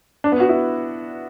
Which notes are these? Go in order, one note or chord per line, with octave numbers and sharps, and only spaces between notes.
D4
B3
F#4
E4